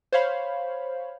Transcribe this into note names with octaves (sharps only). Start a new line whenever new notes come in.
C5 C#5 F5 B5